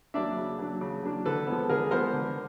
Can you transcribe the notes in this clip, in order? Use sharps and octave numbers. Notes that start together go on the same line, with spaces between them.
F#3 A#3 D4 D5 E5
C#3
F#3 A#3 D4
C#3
F#3 A#3 D4
D3 A4 B4
F3 G#3 B3
D3 G#4 A#4
F3 G#3 B3 A#4 C5
D3